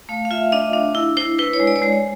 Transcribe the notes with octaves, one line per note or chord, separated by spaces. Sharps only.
A3 F5
F5
F4 E5
D4 D#5
D4
E4
E4 C5
E4 B4
C#5
G#3
D5
C#5
G#3 C5
C#5